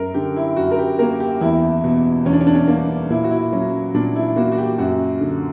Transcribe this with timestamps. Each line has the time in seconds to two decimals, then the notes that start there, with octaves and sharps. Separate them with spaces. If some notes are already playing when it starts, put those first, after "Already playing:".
Already playing: F#2 A#4
0.14 D3 G4
0.36 E4
0.56 F#2 F#4
0.71 A#4
0.79 G4
0.99 A#3 A#4
1.20 G4
1.41 E2 E4
1.84 B2
2.25 E2 C#4
2.33 D4
2.40 C#4
2.47 D4
2.55 C#4
2.67 A#3 D4
3.10 A#2 E4
3.24 F#4
3.31 E4
3.52 F#3 C#4
3.94 A#2 D4
4.16 E4
4.36 A#3 F#4
4.52 F#4
4.58 G4
4.78 F#2 F#4
5.21 D3